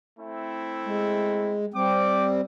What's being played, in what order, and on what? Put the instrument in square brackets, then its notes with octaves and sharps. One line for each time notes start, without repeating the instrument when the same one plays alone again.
[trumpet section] A3 C4 E4
[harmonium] G#3
[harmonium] G3 C4 [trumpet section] G5 D6